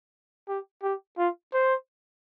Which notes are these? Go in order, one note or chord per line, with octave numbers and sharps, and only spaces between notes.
G4
G4
F4
C5